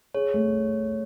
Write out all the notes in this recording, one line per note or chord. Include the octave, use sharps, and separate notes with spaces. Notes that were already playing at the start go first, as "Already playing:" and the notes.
G#4 C#5
A3